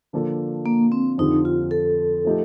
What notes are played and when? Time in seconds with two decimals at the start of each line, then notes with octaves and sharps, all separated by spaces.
0.13 D3 F3 A#3 D4 A4
0.66 A#3
0.92 C4
1.18 F2 D3 F3 C4 D#4 G4
1.45 F4
1.71 A4
2.25 F3 A3 D#4 G4